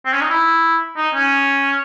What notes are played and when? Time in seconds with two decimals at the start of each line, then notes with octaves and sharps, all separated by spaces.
0.05 C4
0.13 C#4
0.21 D#4
0.29 E4
0.97 D#4
1.14 C#4